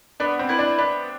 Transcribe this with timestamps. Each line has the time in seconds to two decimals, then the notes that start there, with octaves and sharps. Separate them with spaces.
0.20 B3 D4
0.39 C4
0.49 E4 B4
0.59 D4
0.78 B3 D4